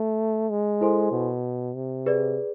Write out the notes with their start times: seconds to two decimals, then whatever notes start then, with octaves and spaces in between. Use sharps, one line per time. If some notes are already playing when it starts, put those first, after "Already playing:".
Already playing: A3
0.50 G#3
0.81 E4 A4 C5 G#5 C6
1.12 B2
1.75 C3
2.06 G#4 B4 D5